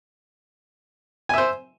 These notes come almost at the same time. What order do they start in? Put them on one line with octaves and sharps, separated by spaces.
G#5 E5 C5